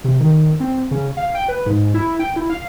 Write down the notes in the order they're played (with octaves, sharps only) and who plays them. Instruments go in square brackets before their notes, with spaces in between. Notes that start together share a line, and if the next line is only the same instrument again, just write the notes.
[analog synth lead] C3
D#3
C4
C#3
F5
G5
B4
G#2
E4
G5
E4
F5